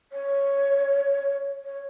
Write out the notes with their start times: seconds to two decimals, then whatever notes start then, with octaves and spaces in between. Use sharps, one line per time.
0.12 C#5
1.65 C#5